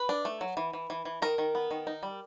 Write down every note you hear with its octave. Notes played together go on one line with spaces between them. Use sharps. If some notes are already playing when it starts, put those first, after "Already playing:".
Already playing: B4
D4
A3
F#3
E3
E3
E3
E3
D#3 A#4
D#3
B3
D#3
D#4
G3